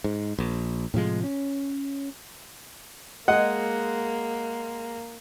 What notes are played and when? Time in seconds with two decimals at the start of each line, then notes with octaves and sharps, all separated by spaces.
0.04 G#2
0.39 A#1
0.94 A2 C3 F3 G#3
1.24 C#4
3.28 G#3 A#3 G#4 D#5 F#5